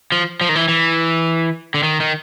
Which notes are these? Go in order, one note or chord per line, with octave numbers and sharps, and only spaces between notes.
F3
F3
D#3
E3
E3
D3
D#3
D#3